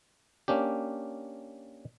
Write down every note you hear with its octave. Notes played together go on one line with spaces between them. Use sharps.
A#3 C#4 D4 G4